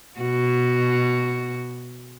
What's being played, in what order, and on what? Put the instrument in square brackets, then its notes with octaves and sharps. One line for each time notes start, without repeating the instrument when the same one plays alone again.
[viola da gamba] B2 F#4